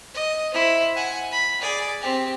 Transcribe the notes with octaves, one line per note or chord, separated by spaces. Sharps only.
D#5
E4 C5
F#5 G#5
B5
G#4 D5
C4 G4